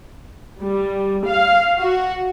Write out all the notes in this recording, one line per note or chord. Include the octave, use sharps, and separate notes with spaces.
G3
F5
F#4